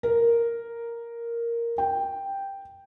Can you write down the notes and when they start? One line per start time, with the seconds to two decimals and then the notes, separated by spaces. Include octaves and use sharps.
0.03 A#4
1.78 G5